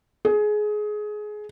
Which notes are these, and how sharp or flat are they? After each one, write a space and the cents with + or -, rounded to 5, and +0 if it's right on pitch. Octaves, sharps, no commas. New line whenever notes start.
G#4 +20